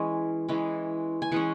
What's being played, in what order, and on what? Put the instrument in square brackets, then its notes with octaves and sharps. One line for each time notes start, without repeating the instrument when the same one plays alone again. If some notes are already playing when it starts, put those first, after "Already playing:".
Already playing: [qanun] E3 G#3 C#4
E3 G#3 C#4
G#5
E3 G#3 C#4 F#5